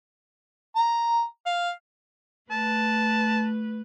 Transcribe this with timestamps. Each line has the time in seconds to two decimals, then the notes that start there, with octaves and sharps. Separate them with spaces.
0.76 A#5
1.46 F5
2.51 A3 B4 A5